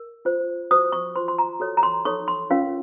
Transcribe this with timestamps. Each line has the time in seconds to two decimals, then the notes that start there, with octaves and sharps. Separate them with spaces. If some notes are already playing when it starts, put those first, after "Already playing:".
Already playing: A#4
0.25 F4 C5
0.71 F#4 C5 D#6
0.92 C#6
1.16 F4 C5 C6
1.28 C6
1.39 A#5
1.60 F#4 A4 C#5
1.77 A#5
1.83 C6
2.05 D#4 A4 C#5 C#6
2.28 C6
2.50 C#4 F4 A#4 C#5 F5